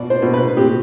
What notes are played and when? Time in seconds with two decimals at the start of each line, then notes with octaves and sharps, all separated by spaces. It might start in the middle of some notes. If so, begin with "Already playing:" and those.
Already playing: B2 D5
0.10 C5
0.22 B2
0.33 B4
0.57 C4 G4